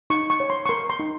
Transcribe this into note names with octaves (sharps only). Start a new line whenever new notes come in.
D#4 C#6
C#6
C#5
C6
C#6
A#4 C6
C6
D#4